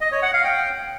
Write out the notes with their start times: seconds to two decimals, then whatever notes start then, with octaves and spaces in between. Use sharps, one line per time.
0.01 D#5
0.12 C#5
0.23 F#5
0.33 F5
0.44 G5